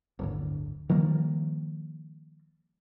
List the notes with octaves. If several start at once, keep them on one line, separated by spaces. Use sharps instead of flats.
D1 G1 D3
D#3 F3 G3 A#3